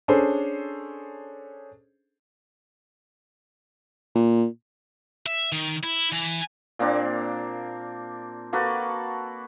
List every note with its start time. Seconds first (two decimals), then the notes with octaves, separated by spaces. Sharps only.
0.08 C#4 D4 G#4 A4 C5
4.15 A#2
5.26 E5
5.52 D#3
5.83 E4
6.12 E3
6.79 A#2 A#3 C4 D4
8.53 A#3 F#4 A4 B4